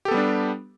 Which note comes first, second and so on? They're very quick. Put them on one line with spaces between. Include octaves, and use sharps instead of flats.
G4 A4 B3 G3 D4